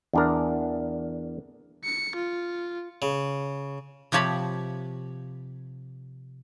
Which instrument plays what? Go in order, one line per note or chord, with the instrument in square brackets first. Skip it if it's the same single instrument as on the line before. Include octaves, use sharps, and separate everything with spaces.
[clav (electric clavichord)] E2 D4 A#4
[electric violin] C#7
F4
[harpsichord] C#3
[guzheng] C3 F3 G4 C#5 A5 B5